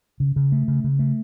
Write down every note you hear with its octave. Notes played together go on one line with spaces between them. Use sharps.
C#3
C#3
A3
C#3
C#3
A3